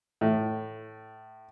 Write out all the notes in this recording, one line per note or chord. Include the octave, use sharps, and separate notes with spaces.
A2